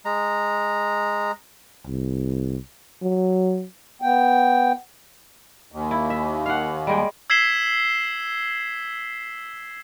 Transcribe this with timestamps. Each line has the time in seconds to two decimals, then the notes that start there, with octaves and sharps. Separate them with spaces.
0.05 G#3 A#5
1.86 C2
3.02 F#3
4.02 B3 G5
5.72 D#2
5.91 E4
6.10 E5
6.46 F5 F#5
6.87 G3 G#3 G5
7.30 E6 G#6 B6 C7 E7 G7